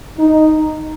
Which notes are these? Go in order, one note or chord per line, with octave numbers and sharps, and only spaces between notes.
D#4